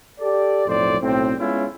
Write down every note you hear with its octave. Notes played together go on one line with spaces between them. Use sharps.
G4 A4 D5
B1 F2 A2 C5 D5
B1 A2 C4
G#3 B3 C#4 E4 F4